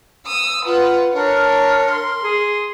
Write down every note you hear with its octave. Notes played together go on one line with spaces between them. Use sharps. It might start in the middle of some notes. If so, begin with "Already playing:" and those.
D#6 E6
F4 B4 F#5
D4 A#4 C#5
C6
G#4